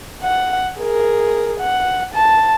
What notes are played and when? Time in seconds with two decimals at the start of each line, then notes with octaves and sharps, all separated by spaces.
0.22 F#5
0.78 G#4 A#4
1.60 F#5
2.14 A5